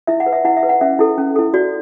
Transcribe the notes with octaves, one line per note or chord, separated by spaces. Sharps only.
E4 E5
F#5
B4
E5
E4 F#5
E5
B4
F#5
C#4 E5
E4 A4
C#4
E4 A4
F#4 D5